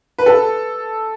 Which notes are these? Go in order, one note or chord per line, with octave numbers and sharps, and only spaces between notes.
B4
A4